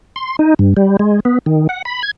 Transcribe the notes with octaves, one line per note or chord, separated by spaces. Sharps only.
C6
D#4
G2
G3
G#3
B3
D#3
F#5
B5
G#6